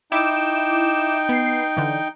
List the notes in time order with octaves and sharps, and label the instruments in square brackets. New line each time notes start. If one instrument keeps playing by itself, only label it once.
[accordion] D#4 G5 [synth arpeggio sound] E4 D6 E7
[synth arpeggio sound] B3 C7
D3 E3